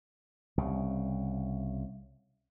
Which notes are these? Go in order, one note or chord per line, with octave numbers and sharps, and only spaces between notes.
C2 C#3